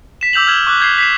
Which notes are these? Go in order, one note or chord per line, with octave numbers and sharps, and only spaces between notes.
B6 E7
D6 E6 G6 F7 F#7
E6 F6 G#6 E7
C#6 D6 F#6
G6 G#6 B6 C7
B6 C7 E7